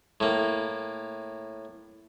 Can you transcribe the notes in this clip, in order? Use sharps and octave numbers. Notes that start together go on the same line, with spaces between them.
A2 A#3